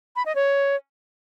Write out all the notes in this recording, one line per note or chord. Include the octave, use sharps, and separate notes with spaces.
B5
D#5
C#5